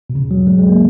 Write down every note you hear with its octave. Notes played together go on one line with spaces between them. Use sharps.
B2
C#3
F#3
G#3
G#3
A#3